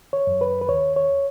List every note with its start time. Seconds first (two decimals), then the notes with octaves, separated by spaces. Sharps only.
0.13 C#5
0.27 F#2
0.41 B4
0.61 B4
0.69 D#2 C#5
0.96 C#5